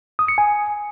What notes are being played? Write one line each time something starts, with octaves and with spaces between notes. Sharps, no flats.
D#6
C#7
G#5